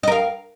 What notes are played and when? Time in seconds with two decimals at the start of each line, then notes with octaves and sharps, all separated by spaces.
0.03 D#5
0.08 A#4
0.12 F5